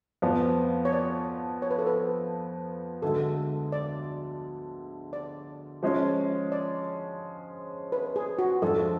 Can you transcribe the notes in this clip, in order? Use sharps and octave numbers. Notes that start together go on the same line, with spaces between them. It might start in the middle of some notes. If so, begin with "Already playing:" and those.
F2 F3 B3 D5
C#5
D5
C#5
B4
A4
B4
D2 D3 G#3 A4
D5
D5
F3 G#3 C#4
D5
B4
G#4
F#4
F2 F3 G#3 D4 F4 A4